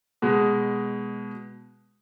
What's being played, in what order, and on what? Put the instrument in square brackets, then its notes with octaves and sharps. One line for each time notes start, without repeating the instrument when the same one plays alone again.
[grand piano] B2 G#3